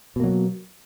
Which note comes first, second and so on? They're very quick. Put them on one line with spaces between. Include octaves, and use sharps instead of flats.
B2 A#3 F#3